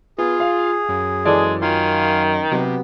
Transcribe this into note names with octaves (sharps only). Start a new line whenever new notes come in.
B3 F4 G#4
F5
F#2
E3 G#3 A4 D5
D#3 F4 F5 G#5 C6
C3 F#3 B3